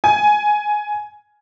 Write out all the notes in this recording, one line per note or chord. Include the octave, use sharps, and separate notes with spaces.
G#5